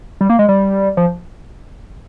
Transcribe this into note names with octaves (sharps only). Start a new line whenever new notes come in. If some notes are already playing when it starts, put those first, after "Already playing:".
G3
A#3
G#3
G3
F3